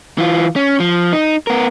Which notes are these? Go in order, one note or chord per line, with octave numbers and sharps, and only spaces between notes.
E3 F4
C#4
F3
D#4
B3 A#4